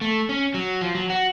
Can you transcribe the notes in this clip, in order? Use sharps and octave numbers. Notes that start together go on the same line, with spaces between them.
A3
C#4
F#3
F3
F#3
F#4